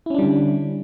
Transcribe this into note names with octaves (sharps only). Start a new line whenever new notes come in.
D3 G3 C#4 D4 E4